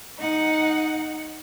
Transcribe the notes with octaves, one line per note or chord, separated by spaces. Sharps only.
D#4 F#5